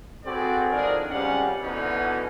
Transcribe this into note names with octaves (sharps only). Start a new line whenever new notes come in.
C4 F#4 G#4 A4 B4 D5
D#3 F3 G#3 D4 G#4 A#4
C#2 G3 C4 C#4 F5 F#5
B2 D3 E3 B3 C#4 D#4